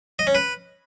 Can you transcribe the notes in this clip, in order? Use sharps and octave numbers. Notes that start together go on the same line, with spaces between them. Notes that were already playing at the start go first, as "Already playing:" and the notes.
D#5
C#4
B4